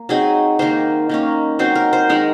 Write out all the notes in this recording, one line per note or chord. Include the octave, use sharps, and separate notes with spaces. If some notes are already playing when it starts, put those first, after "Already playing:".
Already playing: A#3
F#3 C4 D#4 G#4
D#3 A#3 D#4 C5
D#3 A#3 C#4
F#3 C4 D#4 C5
A#4
C5
D#3 G#3 D#4 G#4